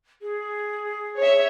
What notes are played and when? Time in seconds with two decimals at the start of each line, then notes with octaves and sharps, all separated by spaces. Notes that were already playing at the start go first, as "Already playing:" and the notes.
0.22 G#4
1.19 C#5 E5